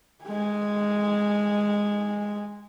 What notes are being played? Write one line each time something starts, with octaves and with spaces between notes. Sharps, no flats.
G#3 G#5